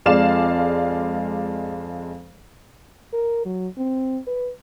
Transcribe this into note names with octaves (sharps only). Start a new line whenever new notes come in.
F2 G#3 D5 F5 E7
A#4
F#3
C4
B4